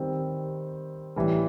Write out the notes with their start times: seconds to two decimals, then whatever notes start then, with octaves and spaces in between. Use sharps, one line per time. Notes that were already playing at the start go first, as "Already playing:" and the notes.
Already playing: D#3 G3 C4
1.16 A2 E3 G3